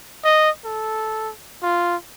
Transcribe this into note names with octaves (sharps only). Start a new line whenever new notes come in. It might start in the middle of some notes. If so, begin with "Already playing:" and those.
D#5
A4
F4